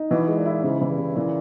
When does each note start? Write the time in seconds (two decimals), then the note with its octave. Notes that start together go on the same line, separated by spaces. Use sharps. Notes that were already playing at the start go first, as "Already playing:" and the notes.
Already playing: D#4
0.11 B2 E3
0.28 G#3
0.37 A#2
0.46 E4
0.54 A#2
0.63 G#2 C#3
0.80 G#2 E3
0.90 G2
0.98 C#3
1.16 A#2 E3